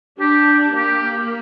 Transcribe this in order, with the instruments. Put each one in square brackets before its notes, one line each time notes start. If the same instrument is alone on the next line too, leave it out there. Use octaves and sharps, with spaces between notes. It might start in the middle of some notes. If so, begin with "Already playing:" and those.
[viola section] D4 [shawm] G4
[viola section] A#3 [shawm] G4